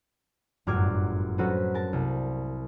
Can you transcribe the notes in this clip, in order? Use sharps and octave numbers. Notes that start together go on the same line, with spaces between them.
G1 F#2 A2 D6 F6 G#6
F#3 C#4 F#4 A4 B4 C5
A#4 A5
C2